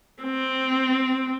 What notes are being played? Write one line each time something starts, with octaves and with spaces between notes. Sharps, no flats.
C4